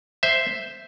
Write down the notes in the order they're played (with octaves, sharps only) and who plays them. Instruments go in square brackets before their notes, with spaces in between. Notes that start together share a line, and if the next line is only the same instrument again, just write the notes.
[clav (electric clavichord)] C5 E5